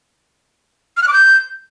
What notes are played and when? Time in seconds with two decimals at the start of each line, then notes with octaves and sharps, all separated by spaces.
0.97 F6
1.02 F#6
1.08 D6
1.13 G6